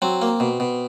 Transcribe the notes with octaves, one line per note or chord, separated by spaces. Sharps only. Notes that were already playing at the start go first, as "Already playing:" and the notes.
F#3 C4
A#3
B2
B2